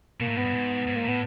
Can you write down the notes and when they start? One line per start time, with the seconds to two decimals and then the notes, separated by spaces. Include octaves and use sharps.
0.20 B2 A#3
0.28 A2
0.36 G#2 B3
0.45 G2
0.53 G#2
0.87 G#2
0.96 A#3
1.04 A2 B3